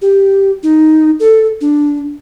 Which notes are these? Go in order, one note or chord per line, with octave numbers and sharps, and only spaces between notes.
G4
D#4
A4
D4